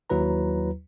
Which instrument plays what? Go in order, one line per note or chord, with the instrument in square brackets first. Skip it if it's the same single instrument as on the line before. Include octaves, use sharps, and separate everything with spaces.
[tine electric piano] D#2 F#3 E4 B4 A#5